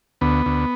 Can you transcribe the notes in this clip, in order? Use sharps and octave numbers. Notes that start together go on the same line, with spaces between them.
D2 B3
D2